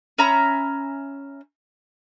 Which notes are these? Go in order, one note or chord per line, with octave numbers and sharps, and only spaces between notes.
C#4 E5 A#5 B5